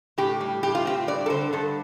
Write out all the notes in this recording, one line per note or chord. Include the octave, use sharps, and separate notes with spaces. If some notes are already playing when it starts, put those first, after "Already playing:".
A2 G4
G3
A2 G4
F4
C4 G4
G2 D5
A4
D3 C5
G2 A4